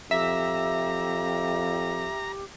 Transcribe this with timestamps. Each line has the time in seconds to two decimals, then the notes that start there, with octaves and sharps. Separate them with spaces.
0.11 F2 G4 E5 A#5